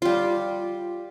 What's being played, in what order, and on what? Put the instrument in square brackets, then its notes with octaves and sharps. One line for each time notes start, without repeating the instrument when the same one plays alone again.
[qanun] G3 F4